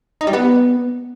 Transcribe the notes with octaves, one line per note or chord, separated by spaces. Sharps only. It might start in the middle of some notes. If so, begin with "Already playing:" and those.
D#4
G3
B3